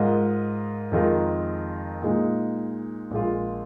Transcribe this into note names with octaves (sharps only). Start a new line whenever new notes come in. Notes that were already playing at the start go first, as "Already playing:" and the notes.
Already playing: G#2 G#3 F4 A#4 D#5
F2 D#3 G#3 F4 A#4
A#2 G#3 D#4
A#1 A#2 G#3 F4